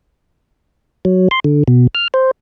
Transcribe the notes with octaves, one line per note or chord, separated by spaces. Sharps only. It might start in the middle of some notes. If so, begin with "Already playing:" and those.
F#3
C6
D3
B2
F6
C5